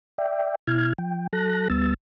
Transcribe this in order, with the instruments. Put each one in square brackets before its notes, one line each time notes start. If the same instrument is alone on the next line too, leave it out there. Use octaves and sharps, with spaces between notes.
[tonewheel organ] D5 E5 G5
B2 E4 F6 G#6
F3 G5
F#3 A4 A5 F#6 A#6
D2 G3 B3 E6 A6